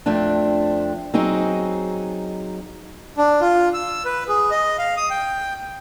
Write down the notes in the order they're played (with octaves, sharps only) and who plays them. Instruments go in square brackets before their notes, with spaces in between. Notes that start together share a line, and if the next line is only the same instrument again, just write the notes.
[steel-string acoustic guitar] F2 A3 C4 D4
F#3 C4 D#4 G#4
[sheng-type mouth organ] D4
F4
E6
B4
G#4
D#5
F5
D#6
G5